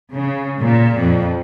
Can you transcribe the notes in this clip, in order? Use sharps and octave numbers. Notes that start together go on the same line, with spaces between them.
C#3
A#2
F2